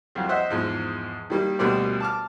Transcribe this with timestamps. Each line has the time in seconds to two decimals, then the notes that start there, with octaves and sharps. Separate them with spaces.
0.15 C2 F2 F#4 F5
0.29 C5 D#5 E5 F#5
0.50 E2 G#2 F3
1.30 D#3 G3 A#3
1.59 D2 B2 G3 A#4 C5 D5
2.00 A5 D6 F6